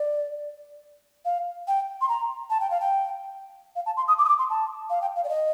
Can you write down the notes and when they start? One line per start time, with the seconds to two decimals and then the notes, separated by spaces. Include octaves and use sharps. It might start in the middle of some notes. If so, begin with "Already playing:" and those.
Already playing: D5
1.25 F5
1.68 G5
2.01 C6
2.09 A#5
2.50 A5
2.60 G5
2.70 F5
2.80 G5
3.76 F5
3.86 A5
3.97 C6
4.08 D#6
4.19 D6
4.25 D#6
4.29 D6
4.39 C6
4.50 A5
4.90 F5
5.02 G5
5.16 F5
5.24 D5
5.29 D#5